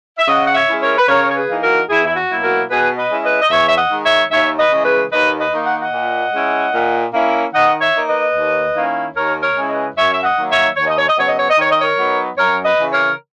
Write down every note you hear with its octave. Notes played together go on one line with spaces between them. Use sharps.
E5
C#3 D#5 F#5
F#5
C#5 E5
G#3 C#4 E4
A#4 C#5
B4
C#3 A#4 C#5
C#5
G#4 B4
E3 A#3 D#4
F#4 A#4
E2 E4 G#4
E4
F#4
B2 F#3 A#3 E4
F#4 A#4
B2 G#4 B4
B4 D#5
G#3 C#4 E4
B4 D#5
D#5
E2 C#5 E5
E5
D#5 F#5
D#3 G#3
C#5 E5
D#2 C#5 E5
B4 D#5
C#3 E3 G#3
G#4 B4
D#2 B4 D#5
B4 D#5
D#3 A#3 D#4
F#5
D#5 F#5
A#2
G#3 C#4 E4
A#2
A#3 C#4 E4
D#3 D#5 F#5
C#5 E5
A#3 D#4
B4 D#5
D#2
D#3 A#3 C#4 E4
D#2 A#4 C#5
A#4 C#5
C#3 G#3 C#4 E4
B4 D#5
F#2 C#5 E5
E5
D#5 F#5
D#3 F#3 A#3 D#4
C#5 E5
D#2 C#5
D#5
C#5
D#5
C#3 F#3 B3 C#5
D#5
C#5
D#5
D#3 C#5
D#5
A#4 C#5
F#3 B3 D#4
F#2 A#4 C#5
B4 D#5
C#3 E3
A#4 C#5